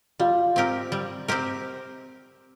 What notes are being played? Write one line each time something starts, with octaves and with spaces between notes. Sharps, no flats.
G3 F4
C4 G4 A#4
G3
C4 G4 A#4